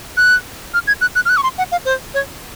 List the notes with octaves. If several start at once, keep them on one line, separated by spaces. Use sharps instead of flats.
F#6
F6
G#6
F#6
F#6
F6
F#6
C#6
C6
F#5
F5
C5
C#5